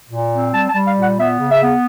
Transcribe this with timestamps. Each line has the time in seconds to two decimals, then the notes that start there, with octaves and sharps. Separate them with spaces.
0.10 A#2
0.32 C4
0.53 G3 A5
0.69 A5
0.74 G3
0.85 F5
0.96 A#2
1.02 F#5
1.17 B3 E5
1.39 C#3
1.50 E5
1.61 B3